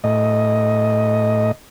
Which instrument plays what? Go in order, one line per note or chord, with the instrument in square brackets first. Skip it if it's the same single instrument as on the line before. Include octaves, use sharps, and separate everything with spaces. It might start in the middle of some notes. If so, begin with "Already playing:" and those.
[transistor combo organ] A2 D#5